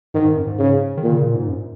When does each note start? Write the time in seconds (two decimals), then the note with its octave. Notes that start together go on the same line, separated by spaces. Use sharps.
0.14 G#2 D#3
0.25 G#2
0.36 F#2
0.47 G#2
0.59 C#3
0.97 D#3
1.03 A#2
1.09 C#3
1.22 A#2
1.35 G#2
1.47 F#2